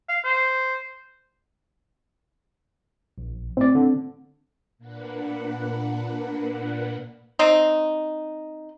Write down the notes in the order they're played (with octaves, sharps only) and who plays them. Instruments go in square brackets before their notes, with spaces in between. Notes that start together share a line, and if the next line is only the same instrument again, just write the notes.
[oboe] F5
C5
[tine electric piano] A#1
[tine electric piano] A2 D5 [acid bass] C4
[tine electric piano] D3
[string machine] A#2 A#3 D4 B4 F#5
[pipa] C4 D#4